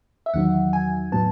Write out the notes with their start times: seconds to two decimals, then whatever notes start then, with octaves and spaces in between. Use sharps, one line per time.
0.26 E5
0.34 E2 D#3 F#3 F#5
0.73 G#5
1.12 A2 F#3 B3 A5